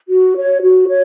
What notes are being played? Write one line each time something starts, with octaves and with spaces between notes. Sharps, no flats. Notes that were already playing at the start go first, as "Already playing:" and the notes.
F#4
C#5
F#4
C#5